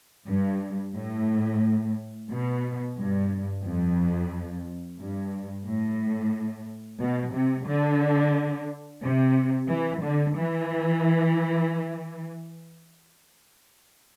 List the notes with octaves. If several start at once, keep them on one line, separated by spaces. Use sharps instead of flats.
G2
A2
B2
G2
F2
G2
A2
B2
C3
D3
C3
E3
D3
E3